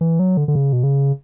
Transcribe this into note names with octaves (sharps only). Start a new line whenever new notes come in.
E3
F#3
D3
D3
C#3
B2
C#3